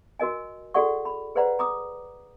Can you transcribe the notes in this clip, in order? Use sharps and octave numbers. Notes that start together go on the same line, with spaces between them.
F#4 A#4 D#5 G#5
F#4 G#4 A4 D5 F#5 C#6
B5
G#4 B4 C5 D5 F#5 A#5
A#5 D6 D#6